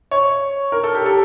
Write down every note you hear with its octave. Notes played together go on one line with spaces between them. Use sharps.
C#5
A#4
A4
G4
A4